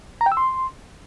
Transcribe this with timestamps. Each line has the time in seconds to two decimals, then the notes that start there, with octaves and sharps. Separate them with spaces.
0.21 A#5
0.26 G5
0.32 E6
0.37 C6